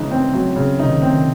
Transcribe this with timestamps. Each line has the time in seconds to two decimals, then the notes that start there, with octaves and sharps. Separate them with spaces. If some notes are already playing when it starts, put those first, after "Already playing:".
Already playing: C#3 E3 G#3 D#4
0.11 C4
0.33 F#3
0.56 C#3
0.79 C3 D#3 D#4
1.02 C4